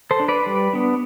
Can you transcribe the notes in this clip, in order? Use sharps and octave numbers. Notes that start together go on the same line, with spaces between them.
A4 C5
D4
B4 D5
G3
B3 D4